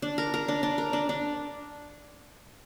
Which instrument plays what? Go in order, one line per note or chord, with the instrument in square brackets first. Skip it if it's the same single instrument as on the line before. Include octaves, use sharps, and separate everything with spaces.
[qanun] D4
A#4
A#4
D4
D4
A#4
D4
D4